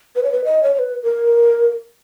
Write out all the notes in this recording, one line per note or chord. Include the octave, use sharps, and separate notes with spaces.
B4
C#5
B4
D#5
C#5
C#5
B4
A#4